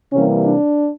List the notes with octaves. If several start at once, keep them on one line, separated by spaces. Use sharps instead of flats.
C3 E3 G3 A#3 C#4
D4